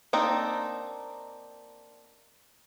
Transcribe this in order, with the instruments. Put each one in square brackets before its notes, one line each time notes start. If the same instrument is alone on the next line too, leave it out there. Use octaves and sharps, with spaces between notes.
[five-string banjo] A#3 C4 D4 D#4